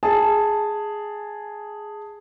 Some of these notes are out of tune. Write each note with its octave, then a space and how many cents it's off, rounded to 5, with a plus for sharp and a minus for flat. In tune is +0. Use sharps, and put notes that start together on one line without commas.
G#4 +0 A5 +5